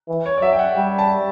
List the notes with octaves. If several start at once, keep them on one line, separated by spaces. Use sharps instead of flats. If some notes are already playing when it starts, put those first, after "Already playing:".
E3
C#5
D5
F#3 E5
G5
F#5
G3 G5
A5